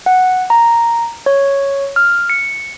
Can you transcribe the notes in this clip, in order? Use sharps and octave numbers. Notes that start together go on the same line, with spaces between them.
F#5
A#5
C#5
F6
C#7